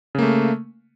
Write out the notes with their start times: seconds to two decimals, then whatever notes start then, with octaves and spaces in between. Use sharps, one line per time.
0.15 C#3
0.18 A#3
0.22 A3